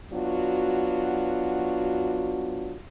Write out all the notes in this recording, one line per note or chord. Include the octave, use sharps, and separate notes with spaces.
F#3 B3 D4 F4 F#4